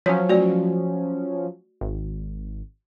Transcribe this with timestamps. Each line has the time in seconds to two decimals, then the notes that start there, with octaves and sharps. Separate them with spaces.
0.06 F3 F#3 C#4 C#5
0.29 A3 F#4 D5
1.81 G#1